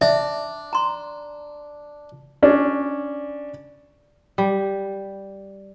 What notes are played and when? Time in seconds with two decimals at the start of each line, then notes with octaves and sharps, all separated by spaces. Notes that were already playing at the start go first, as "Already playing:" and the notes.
0.01 D4 E5
0.73 A#5 C6
2.43 C#4 D4
4.38 G3